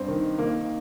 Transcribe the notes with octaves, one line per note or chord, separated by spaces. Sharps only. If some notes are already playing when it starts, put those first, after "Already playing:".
Already playing: G2 C4
D#3
D#3 A#3